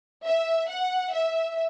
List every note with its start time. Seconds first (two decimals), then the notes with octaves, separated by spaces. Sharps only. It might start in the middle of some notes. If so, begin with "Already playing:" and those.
0.25 E5
0.69 F#5
1.13 E5